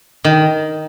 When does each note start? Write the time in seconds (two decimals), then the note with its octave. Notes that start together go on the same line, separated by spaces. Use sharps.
0.24 D#3